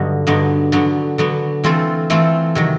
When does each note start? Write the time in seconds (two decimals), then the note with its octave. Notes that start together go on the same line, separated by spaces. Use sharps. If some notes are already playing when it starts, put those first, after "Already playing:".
Already playing: G2 D3 F#3 B3 D#4
0.27 G2 D3 F#3 B3 D#4
0.72 D3 F#3 B3
1.18 D3 F#3 B3
1.64 E3 A3 C4 F4 A4
2.10 E3 A3 C4 F4 A4
2.55 C3 D#3 F#3